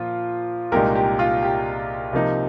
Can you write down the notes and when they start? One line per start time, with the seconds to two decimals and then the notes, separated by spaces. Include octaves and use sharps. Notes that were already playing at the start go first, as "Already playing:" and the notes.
Already playing: A#2 F3 F4
0.72 C2 A#2 G#3 D#4 G4 A#4
0.95 G4
1.19 F4
1.42 G4
2.13 C3 F3 A#3 D#4